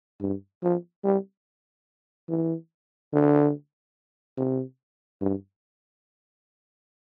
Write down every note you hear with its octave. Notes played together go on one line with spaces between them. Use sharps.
G2
F3
G3
E3
D3
C3
G2